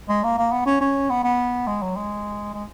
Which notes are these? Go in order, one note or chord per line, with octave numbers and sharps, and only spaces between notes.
G#3
A#3
A#3
B3
C#4
C#4
B3
B3
G#3
F#3
G#3
G#3